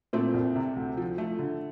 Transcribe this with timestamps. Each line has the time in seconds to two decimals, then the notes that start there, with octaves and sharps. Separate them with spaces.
0.13 A#2 A3 C4
0.34 C2
0.55 C3
0.76 D2
0.97 F3
1.18 F3 A3
1.39 D3